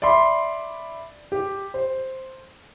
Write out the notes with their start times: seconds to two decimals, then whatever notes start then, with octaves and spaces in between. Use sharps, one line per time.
0.02 D5 E5 B5 C6
1.32 G4
1.74 C5